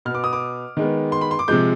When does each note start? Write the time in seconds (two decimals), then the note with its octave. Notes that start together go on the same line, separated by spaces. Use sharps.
0.05 B2 B3 F6
0.15 D6
0.24 D#6
0.33 D6
0.77 D#3 G#3 B3
1.12 C6
1.21 B5
1.31 C6
1.39 D6
1.48 C3 F3 G#3 G6